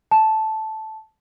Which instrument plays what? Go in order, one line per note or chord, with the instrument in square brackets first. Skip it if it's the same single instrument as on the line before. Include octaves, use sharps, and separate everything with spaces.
[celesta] A5